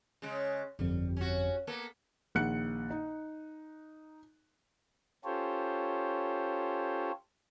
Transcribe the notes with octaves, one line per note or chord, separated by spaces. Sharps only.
C#3 G#3
G1 F2 G3
C#4 F#4
A#3 B3 A4
A#1 D#3 F#5 F#6 C#7
D#4
C#4 F4 G4 A4 C5 C#5